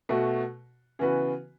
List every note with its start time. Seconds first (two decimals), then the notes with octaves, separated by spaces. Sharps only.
0.09 B2 A3 F#4
0.99 C#3 E3 B3 F#4 B4